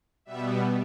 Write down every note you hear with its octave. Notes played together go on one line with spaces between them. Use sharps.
B2 G3 B3 E5